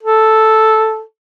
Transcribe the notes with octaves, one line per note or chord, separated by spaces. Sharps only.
A4